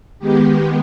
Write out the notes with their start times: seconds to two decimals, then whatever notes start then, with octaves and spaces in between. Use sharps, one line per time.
0.19 D#3 G#3 B3 G4